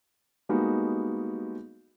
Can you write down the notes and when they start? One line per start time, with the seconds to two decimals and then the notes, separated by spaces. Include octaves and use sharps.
0.49 G3 G#3 A#3 B3 D#4 F#4